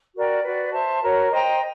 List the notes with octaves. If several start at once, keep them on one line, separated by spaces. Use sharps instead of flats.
F#4 A#4 D5 G5
F#4 B4 D5
C5 E5 A5
F#4 A#4 C#5
C5 D#5 G5 A#5